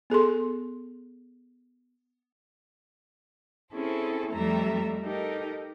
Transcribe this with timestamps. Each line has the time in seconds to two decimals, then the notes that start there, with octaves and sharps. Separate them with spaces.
0.10 B3 G#4 A4 C6
3.72 C4 C#4 E4 G#4 A4 C5
4.33 F2 G3 A3 A4 E5 A#5
5.03 D#4 G4 A4 A#4